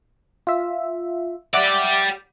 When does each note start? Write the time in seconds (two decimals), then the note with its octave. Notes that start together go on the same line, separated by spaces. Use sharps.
0.47 F4 E5
1.54 G4 D5 E5 F#5 D6